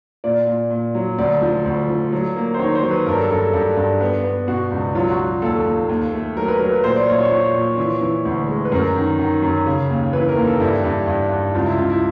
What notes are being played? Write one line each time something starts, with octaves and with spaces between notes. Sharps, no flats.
A#2 D5
A#2
A#2
F#3
D2 D5
F3
D2
F3
F#3
A#3
C5
D#3 C#5
C5
F#3
B4
G2 A#4
A4
G2 A4
A4
G2
G2
B3
B3
B2 F#4
C#2
F#3 F4
F#4
F#3
D#2 A4
D#2
D#2
A3
F#3 A#4
B4
F#3 A#4
B4
A#2 C5
D5
A#2 C#5
C#5
F3 C#5
A#2
E3
E3
D2
G#3
B4
F#2 A#4
D#3
D#3
F#2
C#3
D#2
E3 B4
A#4
D#2
A4
G2 E4
G2
G2
G2
C#2 F4
E4
C#2 F4
E4